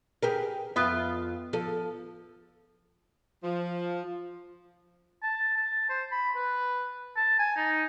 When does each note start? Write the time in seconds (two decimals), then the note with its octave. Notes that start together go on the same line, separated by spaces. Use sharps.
0.23 G4 G#4 A#4 B4
0.76 F2 B3 F4 E5
1.53 F3 A4
3.44 F3
5.23 A5
5.57 A5
5.90 C5
6.12 B5
6.36 B4
7.16 A5
7.39 G#5
7.57 D#4